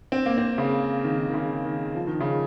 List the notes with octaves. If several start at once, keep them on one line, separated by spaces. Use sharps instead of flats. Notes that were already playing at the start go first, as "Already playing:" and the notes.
C4
A#3
C4
C#3
D#3
D#3
C#3
D#3
F3
D#3
C#3